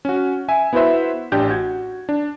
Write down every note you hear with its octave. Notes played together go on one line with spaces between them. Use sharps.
C#4 F#4
E5 G#5
B3 E4 F#4 B4 C5 E5
A1 D4 G4 G6
F#4 G#6
D4